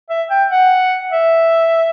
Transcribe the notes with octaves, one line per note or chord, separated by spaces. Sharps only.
E5
G5
F#5
E5